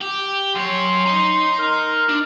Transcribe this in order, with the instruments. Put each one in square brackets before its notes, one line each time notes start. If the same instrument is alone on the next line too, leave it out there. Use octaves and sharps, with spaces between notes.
[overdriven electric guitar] G4
[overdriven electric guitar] F#2 C#5 [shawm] C6
[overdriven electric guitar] D#5 A#5
[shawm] A#4
[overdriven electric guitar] D4